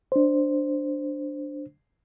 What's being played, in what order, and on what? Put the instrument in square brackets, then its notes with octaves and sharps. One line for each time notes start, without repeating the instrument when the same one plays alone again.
[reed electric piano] D4 C5